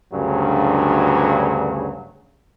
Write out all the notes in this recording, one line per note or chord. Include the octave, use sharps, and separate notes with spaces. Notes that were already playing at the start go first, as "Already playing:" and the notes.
D2 G2 C#3 F#3